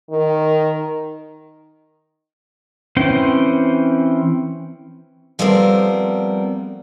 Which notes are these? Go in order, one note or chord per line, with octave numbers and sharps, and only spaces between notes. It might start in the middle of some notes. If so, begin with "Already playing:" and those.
D#3
E3 C4 C#4 C5 G5
F3 G3 A3 B3 C4 A#4